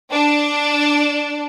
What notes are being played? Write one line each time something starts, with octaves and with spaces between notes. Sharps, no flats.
D4